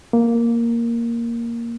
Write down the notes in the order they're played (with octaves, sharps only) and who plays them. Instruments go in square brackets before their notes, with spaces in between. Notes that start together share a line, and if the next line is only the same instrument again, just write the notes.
[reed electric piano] A#3